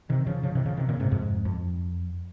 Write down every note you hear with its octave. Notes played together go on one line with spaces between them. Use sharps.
C3 D#3
C#3 F3
C#3 F3
C3 D#3
C#3 F3
C3 D#3
A#2 C#3
G#2 C3
F2 G#2
F2